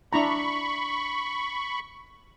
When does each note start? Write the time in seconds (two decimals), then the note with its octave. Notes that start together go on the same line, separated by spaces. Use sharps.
0.13 D4 E4 A#5 B5 C#6